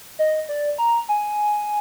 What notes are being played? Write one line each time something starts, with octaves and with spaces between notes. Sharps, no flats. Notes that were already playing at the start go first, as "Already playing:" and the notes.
D#5
D5
A#5
G#5